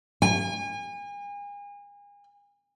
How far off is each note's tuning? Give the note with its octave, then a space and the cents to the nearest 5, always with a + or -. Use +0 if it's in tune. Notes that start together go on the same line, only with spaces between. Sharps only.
G#5 -35